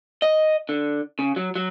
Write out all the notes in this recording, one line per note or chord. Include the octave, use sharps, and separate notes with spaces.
D#5
D3
C#3
F#3
F#3